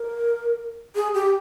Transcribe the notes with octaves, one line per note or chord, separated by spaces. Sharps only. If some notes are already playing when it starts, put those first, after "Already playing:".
Already playing: A#4
G#4
G4